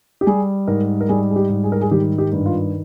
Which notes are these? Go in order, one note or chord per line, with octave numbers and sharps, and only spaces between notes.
G4
G3 G#4
G#2 A#4
A#4
G3 G#4
G#4
G4
G#2
G#4
A#4
G#4
D#3 G4
G4
G2
F4